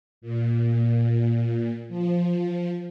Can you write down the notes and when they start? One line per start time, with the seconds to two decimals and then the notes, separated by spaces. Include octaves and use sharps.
0.21 A#2
1.89 F3